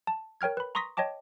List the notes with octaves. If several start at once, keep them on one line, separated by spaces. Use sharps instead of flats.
A5
A#4 C#5 G5 F6 G#6
B4 B5
A#5 C6 C#6 D#6 A#6 B6
C#5 D#5 G5 A5 D6